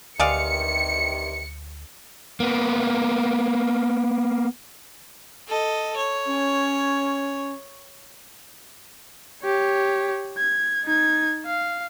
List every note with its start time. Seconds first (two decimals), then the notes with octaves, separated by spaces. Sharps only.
0.20 D2 G2 C3 D#3 G#3 D5 F5 C#7
2.40 A#3 B3
5.47 A4 D#5
5.96 C#5
6.26 C#4
9.43 G4 C#5
10.38 G#6
10.84 D#4 G#6
11.46 F5